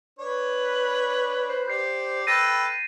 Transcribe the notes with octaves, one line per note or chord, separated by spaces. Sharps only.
D4 B4 C#5
C5
G4 D5 G6 C7
A4 B4 G5 A6 A#6 D#7